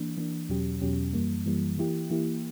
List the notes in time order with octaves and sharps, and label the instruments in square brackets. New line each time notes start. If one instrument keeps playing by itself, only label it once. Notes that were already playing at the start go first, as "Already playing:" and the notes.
Already playing: [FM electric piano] E3 A#3 D4
E3 A#3 D4
E2 B2 F#3 C#4 G4
E2 B2 F#3 C#4 G4
F#2 E3 G3 A#3
F#2 E3 G3 A#3
E3 A#3 E4 G4
E3 A#3 E4 G4